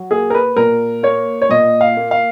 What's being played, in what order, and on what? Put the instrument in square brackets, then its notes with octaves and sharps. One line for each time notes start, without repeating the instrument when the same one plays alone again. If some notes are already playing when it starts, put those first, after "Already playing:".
Already playing: [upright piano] F#3
A#3 G#4
A#4
B4
A#2 A#4
A#3 C#5
C#5
A#2 D#5
F5
A#3
F5